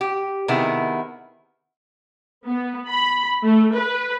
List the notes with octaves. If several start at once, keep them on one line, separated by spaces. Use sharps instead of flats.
G4
C3 D#3 B3 E4 G#4
B3
B5
A3
B4